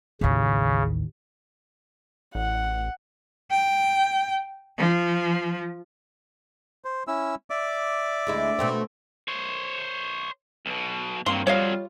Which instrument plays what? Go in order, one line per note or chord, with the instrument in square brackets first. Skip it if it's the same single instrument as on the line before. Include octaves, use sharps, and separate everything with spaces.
[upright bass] A1 D#2 [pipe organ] C#3
[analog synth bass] A1 [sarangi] F#5
[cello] G5
F3
[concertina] C5
C#4 E4 E6
D5 E5 D6
[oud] D2 G#3 E4
B2 A3 C4
[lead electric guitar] C5 C#5
B1 B2
[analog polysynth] G2 A#3 C4 [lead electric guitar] D#3 F#3 [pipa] C6
[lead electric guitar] F2 F#3 [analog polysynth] G3 F4 [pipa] C#5 D#5 F5